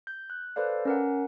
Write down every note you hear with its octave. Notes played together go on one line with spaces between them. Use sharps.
G6
F#6
A4 B4 C5 D5 F5
C#4 A#4 F#5